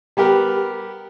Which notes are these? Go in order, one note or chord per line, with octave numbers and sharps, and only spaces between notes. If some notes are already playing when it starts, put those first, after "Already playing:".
G3 B3 G4 A#4